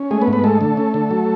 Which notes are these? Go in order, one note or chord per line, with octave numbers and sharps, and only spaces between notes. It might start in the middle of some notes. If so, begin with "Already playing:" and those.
Already playing: C#4
G#3 A3 G#4
B3 B4
G#2
B3 B4
G#3 A3 A4
D3
C#4
D3
F#3